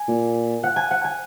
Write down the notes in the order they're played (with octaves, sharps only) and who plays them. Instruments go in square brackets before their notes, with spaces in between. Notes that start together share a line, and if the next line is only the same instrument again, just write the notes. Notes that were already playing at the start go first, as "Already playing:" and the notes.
Already playing: [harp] G#5
[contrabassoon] A#2
[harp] F#5
G#5
F#5
G#5